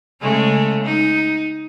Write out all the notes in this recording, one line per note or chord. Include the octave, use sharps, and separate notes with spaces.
C#3 G#3 A3
D#4